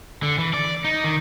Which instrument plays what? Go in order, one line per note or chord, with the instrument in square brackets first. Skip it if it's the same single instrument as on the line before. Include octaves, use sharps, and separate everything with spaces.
[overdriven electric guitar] D3
E3
D5
D#4
D#3